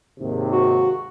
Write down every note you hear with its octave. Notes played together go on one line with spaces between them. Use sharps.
D#2 G#2 C3
F#4